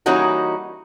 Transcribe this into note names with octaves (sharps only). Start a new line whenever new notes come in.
E3 G3 A#3 C#4 D#4 F#4